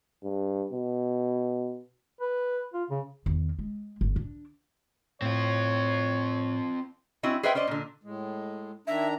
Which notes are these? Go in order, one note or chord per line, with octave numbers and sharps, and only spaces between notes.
G2
B2
B4
F4
C#3
E2 D#3
G#3
G1
D4
A2 C4 F4 C#5
C4 C#4 E4 F#4 D#5
G#4 B4 C5 D#5 E5 G5
C#4 C5 D5 D#5
A#2 D3
A2 G#3
D#3 D4 E5 A#5